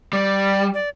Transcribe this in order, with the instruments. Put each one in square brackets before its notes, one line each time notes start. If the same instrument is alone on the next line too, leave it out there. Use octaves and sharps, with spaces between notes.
[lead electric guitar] G3 [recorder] D5
[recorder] D5